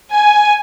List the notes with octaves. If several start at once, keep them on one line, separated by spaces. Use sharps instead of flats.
G#5